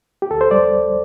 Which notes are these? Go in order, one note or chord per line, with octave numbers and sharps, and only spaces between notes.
G4
D2 A4
C5
G3 D5